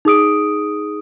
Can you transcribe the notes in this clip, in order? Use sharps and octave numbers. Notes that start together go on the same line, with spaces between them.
D#4 G#4 D#6 D7